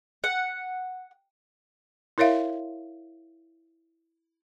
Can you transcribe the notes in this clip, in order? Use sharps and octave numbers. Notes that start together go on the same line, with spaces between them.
F#5
E4 A#4 C#5 E5 F5